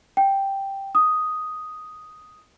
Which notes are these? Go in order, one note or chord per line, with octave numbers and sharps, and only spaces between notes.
G5
D#6